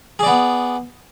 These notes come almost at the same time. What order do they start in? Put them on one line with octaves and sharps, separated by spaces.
G#4 D5 B3